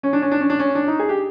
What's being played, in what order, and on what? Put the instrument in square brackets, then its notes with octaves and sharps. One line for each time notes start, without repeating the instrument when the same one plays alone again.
[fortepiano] C#4
D4
C#4
D4
C#4
D4
C#4
D4
D#4
G#4
G4